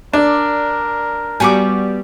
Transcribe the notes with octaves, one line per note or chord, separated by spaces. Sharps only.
D4 A#4 D5
G3 B3 F#4 G#5 C#6 D6